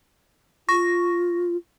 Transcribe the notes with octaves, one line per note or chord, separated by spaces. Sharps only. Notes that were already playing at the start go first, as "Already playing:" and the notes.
F4 C#6 A#6